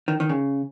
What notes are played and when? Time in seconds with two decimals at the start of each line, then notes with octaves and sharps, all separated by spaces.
0.08 D#3
0.20 D#3
0.29 C#3